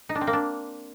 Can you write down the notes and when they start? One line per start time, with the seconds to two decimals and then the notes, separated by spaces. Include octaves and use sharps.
0.09 D#4
0.15 D4
0.21 C4
0.27 A#3
0.33 D4